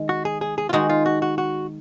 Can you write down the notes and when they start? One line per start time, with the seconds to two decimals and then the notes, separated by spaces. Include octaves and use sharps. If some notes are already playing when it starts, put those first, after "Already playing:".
Already playing: D#3 G#3
0.09 F#4
0.25 G#4
0.41 G#4
0.58 G#4
0.69 F4
0.73 D#3 G#3 D#4 F#4
0.89 F4
1.06 F#4
1.22 F#4
1.38 F#4